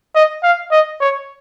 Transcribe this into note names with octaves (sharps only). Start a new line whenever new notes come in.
D#5
F5
D#5
C#5